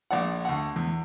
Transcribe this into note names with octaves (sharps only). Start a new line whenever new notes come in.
A#1 D5 F#5
D2 F#5
E2